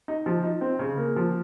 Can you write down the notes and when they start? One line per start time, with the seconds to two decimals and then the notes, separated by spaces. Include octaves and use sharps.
0.08 D#4
0.26 F3
0.44 D#4
0.61 C4
0.79 C#3
0.98 A#3
1.16 F3